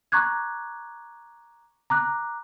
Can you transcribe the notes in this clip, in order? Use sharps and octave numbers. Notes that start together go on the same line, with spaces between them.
A#5 C#6 D6 F#6 G#6
A#5 D6 F#6